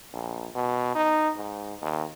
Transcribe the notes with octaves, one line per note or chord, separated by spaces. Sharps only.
A#1
B2
D#4
G#2
D#2